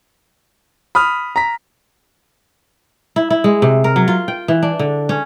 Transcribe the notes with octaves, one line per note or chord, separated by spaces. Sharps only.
B5 D#6 F6
A#5 B6
E4
E4
G#3
C3
A#4
F#3
F4
G5
E3
D4
D3
C#4